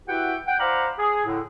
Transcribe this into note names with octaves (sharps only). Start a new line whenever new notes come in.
E4 F#4 G4 B4 F#5 G5
F#5 G5
C5 D5 F5 F#5 A#5 B5
G#4
A2 D3